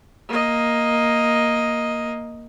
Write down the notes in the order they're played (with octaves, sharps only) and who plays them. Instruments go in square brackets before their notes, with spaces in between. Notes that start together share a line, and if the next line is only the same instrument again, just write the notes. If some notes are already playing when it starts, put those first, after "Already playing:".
[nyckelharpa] A#3 D#5